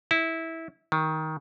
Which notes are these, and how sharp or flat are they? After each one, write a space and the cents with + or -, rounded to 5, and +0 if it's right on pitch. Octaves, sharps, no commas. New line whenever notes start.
E4 -15
D#3 +15